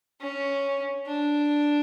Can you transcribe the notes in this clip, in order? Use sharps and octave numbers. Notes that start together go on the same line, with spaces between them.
C#4
D4